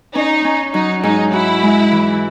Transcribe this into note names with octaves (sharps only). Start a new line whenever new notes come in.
C#4 D#4
C#4
F#3 D#4
G#2 D#4
E4 F#4
G#3
E3